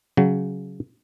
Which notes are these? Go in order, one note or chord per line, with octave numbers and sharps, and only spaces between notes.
C#3 F#3